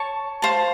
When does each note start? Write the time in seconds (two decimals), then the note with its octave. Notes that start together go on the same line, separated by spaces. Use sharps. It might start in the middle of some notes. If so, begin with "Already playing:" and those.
Already playing: C#5 A5 C#6
0.42 C5 F5 A5